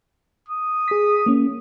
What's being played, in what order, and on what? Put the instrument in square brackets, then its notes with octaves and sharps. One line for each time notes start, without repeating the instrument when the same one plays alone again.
[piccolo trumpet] D#6
[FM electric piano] G#4 B6
A#3 C#4